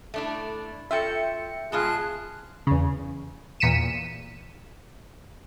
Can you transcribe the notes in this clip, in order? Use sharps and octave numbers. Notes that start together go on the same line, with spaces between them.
A3 D4 E4
F4 F#4 A4 E5 G5 C#7
B2 G#3 F4 G#4 A5 F#6
E2 C#3
E2 A#2 B6 C#7 D#7 E7